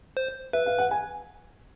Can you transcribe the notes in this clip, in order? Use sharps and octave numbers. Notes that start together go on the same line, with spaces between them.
C5
B4 E5
F5
F#5
G#5